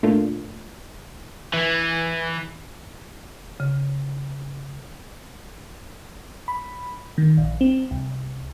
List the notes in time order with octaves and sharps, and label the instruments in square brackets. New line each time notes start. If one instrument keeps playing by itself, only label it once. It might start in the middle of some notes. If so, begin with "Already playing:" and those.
[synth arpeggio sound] A#2 A3 A#3 D4 F4
[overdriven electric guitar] E3
[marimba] C#3
[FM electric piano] B5
D#3
A#1
C4
C2